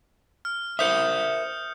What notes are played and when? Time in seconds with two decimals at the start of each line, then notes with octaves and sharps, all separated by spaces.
0.45 F6
0.79 A#4 C5 E5 D#6 G6 C#7